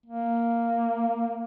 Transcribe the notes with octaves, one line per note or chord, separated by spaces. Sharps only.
A#3